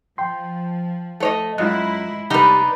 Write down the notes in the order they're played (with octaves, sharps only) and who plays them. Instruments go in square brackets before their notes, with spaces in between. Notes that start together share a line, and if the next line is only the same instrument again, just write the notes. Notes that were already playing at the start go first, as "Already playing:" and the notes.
[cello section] F3 [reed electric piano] G5 C6
[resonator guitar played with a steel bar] A3 C#5 D#5
[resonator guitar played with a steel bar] F#2 [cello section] G#3 E4 [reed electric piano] F4 D#5 F#6
[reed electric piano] C3 [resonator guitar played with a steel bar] G3 [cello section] D4 [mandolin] D#4 B4